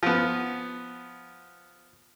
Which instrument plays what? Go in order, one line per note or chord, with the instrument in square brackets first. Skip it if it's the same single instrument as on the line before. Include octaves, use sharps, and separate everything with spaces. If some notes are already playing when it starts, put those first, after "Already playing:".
[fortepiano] F3 B3